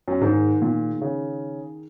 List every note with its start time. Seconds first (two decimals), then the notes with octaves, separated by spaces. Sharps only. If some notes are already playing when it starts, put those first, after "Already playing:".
0.08 F#2
0.21 G#2 D#3 A#3 D#4 G#4
0.62 A#2
1.02 C#3